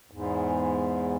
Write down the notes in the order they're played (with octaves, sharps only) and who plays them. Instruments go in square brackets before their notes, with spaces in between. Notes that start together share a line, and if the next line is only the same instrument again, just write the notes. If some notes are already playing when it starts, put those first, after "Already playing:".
[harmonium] E2 G#2